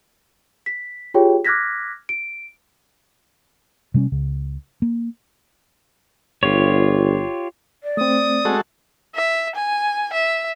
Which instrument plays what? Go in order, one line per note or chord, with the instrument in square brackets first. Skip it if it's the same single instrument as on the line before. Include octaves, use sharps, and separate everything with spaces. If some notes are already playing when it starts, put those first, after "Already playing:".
[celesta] B6
F4 G4 G#4 C#5 G5
D6 F6 F#6 G#6 A#6 B6
D7
[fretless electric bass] C3 G3 B3 C#4
C#2 C#3
A#3
[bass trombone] G1 [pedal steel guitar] F4 G4 C#5
[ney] D5
[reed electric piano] A3 C4 [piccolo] D#6
[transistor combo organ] G#3 F#4 A4
[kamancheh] E5
G#5
E5